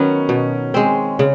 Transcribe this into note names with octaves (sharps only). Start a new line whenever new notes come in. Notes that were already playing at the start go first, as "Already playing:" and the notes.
Already playing: D#3 F#3 B3 C#4
B2
G#3 C4
C#3